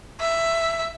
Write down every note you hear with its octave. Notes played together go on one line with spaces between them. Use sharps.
E5